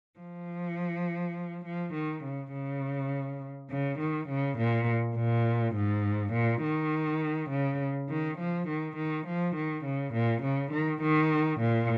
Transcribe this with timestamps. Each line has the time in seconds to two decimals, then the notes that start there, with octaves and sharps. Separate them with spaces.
0.19 F3
1.65 F3
1.94 D#3
2.23 C#3
2.52 C#3
3.70 C#3
4.00 D#3
4.28 C#3
4.58 A#2
5.16 A#2
5.75 G#2
6.33 A#2
6.63 D#3
7.50 C#3
8.09 D#3
8.38 F3
8.68 D#3
8.96 D#3
9.27 F3
9.55 D#3
9.84 C#3
10.14 A#2
10.43 C#3
10.72 D#3
11.02 D#3
11.60 A#2